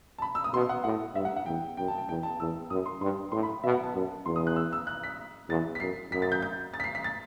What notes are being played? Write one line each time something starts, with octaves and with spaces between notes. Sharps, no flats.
A5
B5
E6
D#6
B2 C6
F#5
A2 F#5
G2 E5
F#5
F#5
E2 G5
F#2 G5
A5
G5
E2 G5
A5
E2 E6
F#2 D#6
C6
G2 C6
A2 C6
B5
B2 E5
F#5
A5
F#2 A5
E2 C6
D#6
F#6
E6
E6
F#6
B6
E2 A6
B6
F#2 C7
F#2 B6
A6
G6
G6
A6
B6
C7
B6
A6